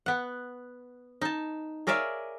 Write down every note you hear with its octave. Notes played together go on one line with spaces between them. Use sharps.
B3 F#5
D#4 A5
G#4 A#4 C#5 D5 E5 F5